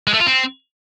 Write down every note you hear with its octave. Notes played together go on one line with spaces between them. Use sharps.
G#3
A3
F4
C4